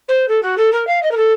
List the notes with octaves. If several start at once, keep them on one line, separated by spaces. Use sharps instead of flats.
C5
A4
F#4
A4
A#4
F5
D#5
A#4
A4